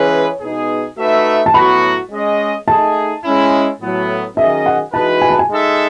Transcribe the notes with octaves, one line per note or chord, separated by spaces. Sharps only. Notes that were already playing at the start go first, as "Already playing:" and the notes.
Already playing: E3 G#3 C#4 G#4 B4 C#5
B2 G#3 B3 D#4 G#4
A3 D#4 F#4 B4 E5
A5
A2 F#3 B3 F#4 B5
G#3 C#4 G#4 D#5
A3 D#4 G#4 A5
G#3 C#4 E4
A2 F#3 B3
D#3 F#3 C#4 G#4 D#5 E5
F#5
E3 G#3 D#4 F#4 B4 A5
G#5
A5
G#5
G#3 D#4 A4 E5